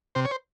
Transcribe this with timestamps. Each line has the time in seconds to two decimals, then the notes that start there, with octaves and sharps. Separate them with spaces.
0.15 C3 C5
0.25 C#5
0.31 C5